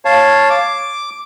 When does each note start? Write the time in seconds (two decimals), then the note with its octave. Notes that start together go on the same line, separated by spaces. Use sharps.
0.05 C#5 F5 A5
0.50 D6